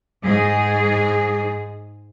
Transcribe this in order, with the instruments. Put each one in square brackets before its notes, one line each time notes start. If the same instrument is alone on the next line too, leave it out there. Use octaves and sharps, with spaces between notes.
[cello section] G#2 G#4